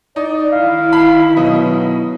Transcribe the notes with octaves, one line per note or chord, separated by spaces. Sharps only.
D#4 D5
D#3 E4 F5
B5
B2 F#3 D#5